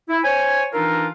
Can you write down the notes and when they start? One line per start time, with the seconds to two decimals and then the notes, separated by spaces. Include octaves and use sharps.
0.09 E4
0.24 C5 C#5 G#5
0.73 E3 D4 D#4 F4 A4 A#4